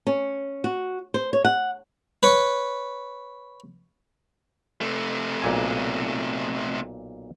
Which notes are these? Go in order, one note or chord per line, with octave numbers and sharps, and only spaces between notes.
C#4
F#4
C5
C#5
F#5
B4 C#5
C3 A3
B1 A#2 G#5